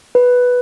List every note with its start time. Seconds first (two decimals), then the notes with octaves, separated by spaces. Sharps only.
0.15 B4